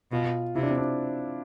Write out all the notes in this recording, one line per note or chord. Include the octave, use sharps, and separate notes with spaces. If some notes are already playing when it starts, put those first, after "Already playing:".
B2 F4
C3 E4
D4
C4
D4